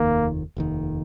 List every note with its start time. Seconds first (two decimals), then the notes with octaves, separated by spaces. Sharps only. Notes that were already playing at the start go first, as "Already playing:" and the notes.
Already playing: F1 D#2 D#3 A#3
0.57 F1 D#2 D#3